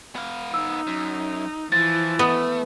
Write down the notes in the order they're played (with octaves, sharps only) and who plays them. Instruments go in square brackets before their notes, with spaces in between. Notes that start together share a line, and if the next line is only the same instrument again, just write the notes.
[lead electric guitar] B3 F5
[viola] D#4 [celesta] E6
[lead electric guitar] F#2
[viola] E3 [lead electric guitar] F3 [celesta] A6
[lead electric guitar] A3 [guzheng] B3